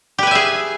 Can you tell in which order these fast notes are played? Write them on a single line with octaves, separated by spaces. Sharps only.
G4 B4 G#5 E5 G#4